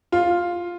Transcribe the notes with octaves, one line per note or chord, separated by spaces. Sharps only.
F4